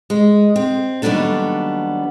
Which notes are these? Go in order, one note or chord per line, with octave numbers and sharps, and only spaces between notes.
G#3
C4
D#2 F#3 G3 B3 D4 A4